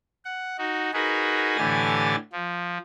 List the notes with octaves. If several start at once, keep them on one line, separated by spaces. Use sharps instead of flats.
F#5
D#4 F#4
D#4 F#4 G#4 A#4 B4
A2 D3 E3 G4 G#5 A6
F3